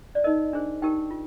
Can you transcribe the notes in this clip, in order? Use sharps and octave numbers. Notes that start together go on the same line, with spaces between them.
D5
D#4 A#4 D#5
D4 G#4 C5
D#4 G4 A#4 G5
F4